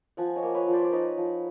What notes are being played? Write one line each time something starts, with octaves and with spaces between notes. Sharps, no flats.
F3 F#5 G#5
C#5 D#5
A#3
B4 C#5
F3
C5 D5
D5
D#4 B4 C#5
F3